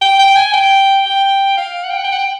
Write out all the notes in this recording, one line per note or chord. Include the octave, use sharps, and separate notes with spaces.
G5
G5
G#5
G5
G5
F5
F#5
G5
F#5
G5
F#5
G5